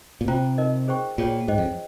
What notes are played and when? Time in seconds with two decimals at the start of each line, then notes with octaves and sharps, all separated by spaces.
0.21 A#2
0.28 C3 F4 C5 G5 A#5
0.58 D#4 A#4 D#5
0.88 G#4 C5 G5 C#6
1.18 A#2 F4 G#4 C#5 G5
1.47 G#2 G#4 C5 D#5 G5
1.58 F2